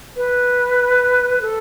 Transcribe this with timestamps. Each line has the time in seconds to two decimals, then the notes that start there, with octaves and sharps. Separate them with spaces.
0.16 B4
1.41 A4